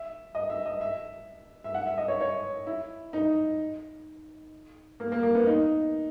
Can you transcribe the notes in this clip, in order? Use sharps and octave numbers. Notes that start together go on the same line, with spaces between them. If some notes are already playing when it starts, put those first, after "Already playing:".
Already playing: E5
D#5
E5
D#5
E5
E5
F#5
E5
D#5
C#5
C#5
E4
D#4
A#3
A#3
A#3
B3
D#4